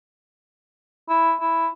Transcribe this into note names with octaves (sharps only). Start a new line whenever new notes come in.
E4
E4